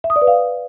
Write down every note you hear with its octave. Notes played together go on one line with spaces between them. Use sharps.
E5
D#6
D5
B4
F5